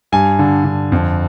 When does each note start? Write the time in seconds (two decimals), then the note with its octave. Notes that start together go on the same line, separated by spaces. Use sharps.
0.12 G2 G#5
0.39 D3
0.65 D3
0.92 F2